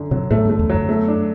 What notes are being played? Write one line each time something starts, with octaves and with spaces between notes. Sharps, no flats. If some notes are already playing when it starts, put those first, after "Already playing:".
Already playing: F#2 D3
C3 F#3
A2 A3
G2
A3
E2
F#2 F#3
A3
D4